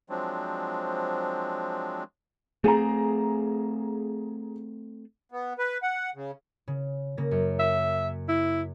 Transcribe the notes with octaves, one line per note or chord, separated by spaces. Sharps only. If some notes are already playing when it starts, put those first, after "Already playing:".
F3 F#3 G#3 C4 D4
A3 A#3 C4 G#4 A#5
B3
B4
F#5
C#3
C#3
C#3 A#3 A#6
F#2
E5
E4